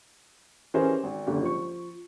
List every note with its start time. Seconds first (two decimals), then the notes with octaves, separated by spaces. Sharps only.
0.74 E3 C#4 G4 G#4 A#4 C5
1.03 G#1
1.27 F#1 G#2 D3 G4
1.41 F3 C#6